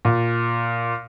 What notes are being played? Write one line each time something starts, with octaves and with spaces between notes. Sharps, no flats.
A#2